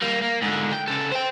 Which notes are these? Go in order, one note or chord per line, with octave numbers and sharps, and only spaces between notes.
G3 A#3
A#3
G#2 D3
G5
C#3 A4
C5 G5